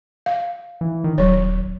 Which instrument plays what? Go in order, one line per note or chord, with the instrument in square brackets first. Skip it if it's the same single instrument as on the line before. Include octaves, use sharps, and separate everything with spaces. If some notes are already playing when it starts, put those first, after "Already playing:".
[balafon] F5
[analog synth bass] E3
D#3
[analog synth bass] D#1 [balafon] F#3 C#5